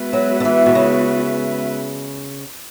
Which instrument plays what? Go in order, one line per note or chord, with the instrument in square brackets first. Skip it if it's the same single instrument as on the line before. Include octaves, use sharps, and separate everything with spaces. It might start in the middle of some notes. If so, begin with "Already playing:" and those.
Already playing: [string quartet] G#3 B3 F#4 B4 E5
[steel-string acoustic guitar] F#3
D3
E3
B2
C#3